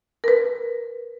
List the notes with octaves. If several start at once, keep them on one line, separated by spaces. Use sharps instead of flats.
A#4 B4